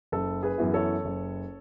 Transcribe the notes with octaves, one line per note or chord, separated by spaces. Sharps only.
F#1 A4
G#4 B4
F#2 E3 B3 E4
A4 C#5
F#1